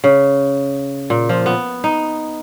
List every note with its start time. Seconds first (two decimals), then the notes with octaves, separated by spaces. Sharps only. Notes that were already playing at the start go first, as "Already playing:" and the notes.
0.04 C#3
1.10 A#2
1.29 F3
1.46 B3
1.84 D#4